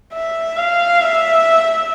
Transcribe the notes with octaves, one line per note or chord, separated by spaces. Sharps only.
E5
F5
E5